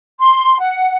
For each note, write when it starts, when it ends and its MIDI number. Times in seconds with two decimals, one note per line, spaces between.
0.20 0.58 84
0.60 0.97 78